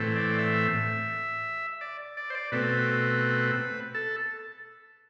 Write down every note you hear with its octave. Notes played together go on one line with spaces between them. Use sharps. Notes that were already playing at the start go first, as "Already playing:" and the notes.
Already playing: A2 E3 A3 C4
D5
E5
D5
D5
C5
D5
B2 A3 C4 B4
A4